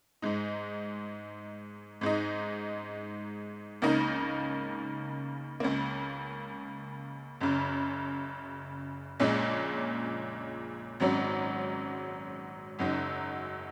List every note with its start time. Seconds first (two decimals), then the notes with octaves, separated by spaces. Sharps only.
0.22 G#2 G#3 D#4
2.01 G#2 G#3 D#4
3.82 C#2 C#3 A#3 D#4
5.60 C#2 C#3 A#3
7.41 F#1 F#2 C#3
9.20 A#1 A#2 G#3 C#4
11.00 G#1 G#2 F#3 C#4
12.79 F#1 F#2 F#3 D#4